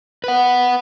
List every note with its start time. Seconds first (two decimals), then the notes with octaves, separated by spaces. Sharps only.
0.24 B4 F#5